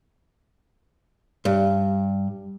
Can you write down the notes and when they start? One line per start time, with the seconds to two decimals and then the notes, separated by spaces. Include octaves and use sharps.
1.45 G2